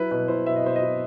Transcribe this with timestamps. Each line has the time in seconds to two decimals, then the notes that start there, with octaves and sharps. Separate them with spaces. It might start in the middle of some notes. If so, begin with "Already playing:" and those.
Already playing: F#3 E4 B4
0.11 B2 B4
0.28 E4 C5
0.46 B2 E5
0.56 D#5
0.64 B2 C5
0.76 D#5
0.82 E4